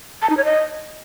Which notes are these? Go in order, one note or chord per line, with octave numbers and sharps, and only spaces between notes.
A5
D#4
C#5
D#5